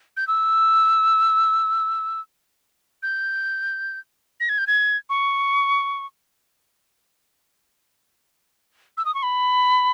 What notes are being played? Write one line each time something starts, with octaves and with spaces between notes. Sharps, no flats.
G6
E6
G6
A#6
G#6
G6
G#6
C#6
E6
D#6
C#6
B5